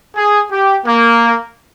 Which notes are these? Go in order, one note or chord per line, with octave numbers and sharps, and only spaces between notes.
G#4
G4
A#3